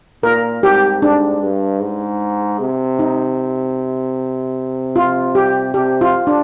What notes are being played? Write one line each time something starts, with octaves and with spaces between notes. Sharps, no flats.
A#2 A#4
G#2 G4
G#2 D4
G2
G#2
C3
D#4
F4
G4
C3 G4
F4
D4